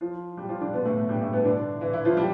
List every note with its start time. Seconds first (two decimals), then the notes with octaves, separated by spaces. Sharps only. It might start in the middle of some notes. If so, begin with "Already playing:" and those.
0.01 F3 F4
0.37 G3 G4
0.49 F3 F4
0.61 D3 D4
0.73 B2 B3
0.85 A2 A3
1.09 G2 G3
1.21 A2 A3
1.33 B2 B3
1.45 D3 D4
1.81 E3 E4
1.93 E3 E4
2.05 F3 F4
2.17 G3 G4